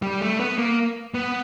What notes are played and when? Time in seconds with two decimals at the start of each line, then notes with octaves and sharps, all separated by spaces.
0.02 G3
0.21 A3
0.40 B3
0.58 A#3
1.14 B3